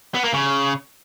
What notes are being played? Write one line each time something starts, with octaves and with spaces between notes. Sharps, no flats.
B3
A#3
C#3